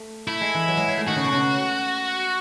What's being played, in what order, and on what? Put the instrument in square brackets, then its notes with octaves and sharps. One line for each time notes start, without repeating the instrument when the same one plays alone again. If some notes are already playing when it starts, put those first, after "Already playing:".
Already playing: [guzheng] A3
[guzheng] A3 [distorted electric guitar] E4
[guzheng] G#3
E3
F#3
G#3
G#3
A3
[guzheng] D#3 [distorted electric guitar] F#4
[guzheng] C#3
B2
C#3